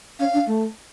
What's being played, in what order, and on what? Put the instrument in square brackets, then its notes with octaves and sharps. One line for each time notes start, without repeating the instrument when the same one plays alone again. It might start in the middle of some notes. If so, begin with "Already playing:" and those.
[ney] C#4 [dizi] F5
[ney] D4
A3